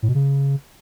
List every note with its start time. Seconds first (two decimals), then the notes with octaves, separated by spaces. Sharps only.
0.03 A2
0.09 B2
0.15 C#3